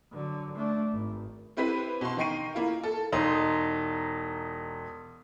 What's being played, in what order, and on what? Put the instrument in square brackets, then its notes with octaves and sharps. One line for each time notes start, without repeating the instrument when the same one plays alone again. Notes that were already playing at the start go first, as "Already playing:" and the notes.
[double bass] D3 F#3
A3 D4
G#1
[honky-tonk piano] C4 E4 G4 B4 C5 B6
B2 C6
D#3 D#4 G5 C#6 C7 D#7
A#3 E4 F4
A4
[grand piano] E1 D#4 C6